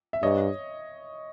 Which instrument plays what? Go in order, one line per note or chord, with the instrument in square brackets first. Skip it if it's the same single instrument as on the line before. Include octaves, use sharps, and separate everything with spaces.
[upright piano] E5
[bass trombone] G2 [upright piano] C#5 D#5